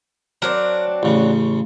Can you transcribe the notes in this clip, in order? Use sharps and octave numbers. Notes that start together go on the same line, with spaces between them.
F#3 C4 D4 A#4
A1 C#3